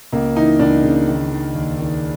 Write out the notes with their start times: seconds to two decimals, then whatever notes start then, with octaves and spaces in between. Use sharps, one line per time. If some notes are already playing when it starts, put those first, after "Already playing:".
0.13 C#2 A#3
0.36 E3 D#4
0.59 C#2 D4
0.84 C#3
1.08 D#3
1.31 D#3
1.55 D#2
1.79 D#3